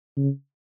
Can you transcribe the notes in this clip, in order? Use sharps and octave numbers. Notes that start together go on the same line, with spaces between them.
C#3